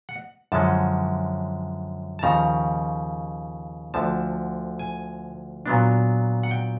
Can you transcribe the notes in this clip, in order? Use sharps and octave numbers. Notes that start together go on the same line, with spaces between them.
F#5
F#2 D3 F3 G#3 C#4 A5
A5
D#2 C#3 F3 A#5
D2 D3 F3 A5
G#5
A#2 F#3 B3 D4
F#5
G5